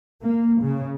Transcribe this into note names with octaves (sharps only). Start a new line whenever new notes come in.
A#3
C#3